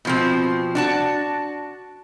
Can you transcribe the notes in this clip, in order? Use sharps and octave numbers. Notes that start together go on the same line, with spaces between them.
B2 F3 C4
D4 F#4 A5